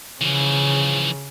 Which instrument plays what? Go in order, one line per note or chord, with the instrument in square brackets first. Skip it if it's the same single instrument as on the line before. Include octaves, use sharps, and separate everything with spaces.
[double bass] C#3 [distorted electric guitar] E3 F3